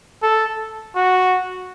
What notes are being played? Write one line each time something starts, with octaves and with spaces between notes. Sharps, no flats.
A4
F#4